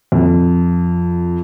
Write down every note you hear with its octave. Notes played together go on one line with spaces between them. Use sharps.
F2